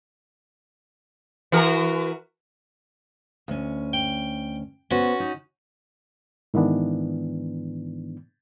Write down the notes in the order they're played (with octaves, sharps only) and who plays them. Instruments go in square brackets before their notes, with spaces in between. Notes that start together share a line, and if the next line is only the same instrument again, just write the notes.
[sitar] E3 F#4 A#4
[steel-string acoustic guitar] D2 C#4
[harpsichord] G5
[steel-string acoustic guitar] B3 C5 [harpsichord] C#4 F#4
[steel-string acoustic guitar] D#4
[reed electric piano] G#2 D#3 E3 B3 D4